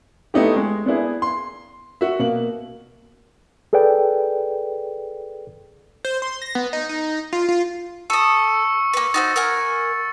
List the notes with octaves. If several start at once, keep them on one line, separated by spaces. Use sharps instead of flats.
A3 B3 D#4 E4 G4
G#3
B3 D4 E4 G#4
C6
F#4 E5
B2 A#3 F#7
G#4 A4 B4 D5 G5
C5
C6
A#6
B3
D#4
D#4
F4
F4
A4 C#6 D#6 E6 C#7
A#3 B4
D#4 F#4 C5 A6
A#4 F#5 G#5